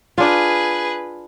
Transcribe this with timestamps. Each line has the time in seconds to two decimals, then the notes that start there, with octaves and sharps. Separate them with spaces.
0.18 D4 F4 G#4 B4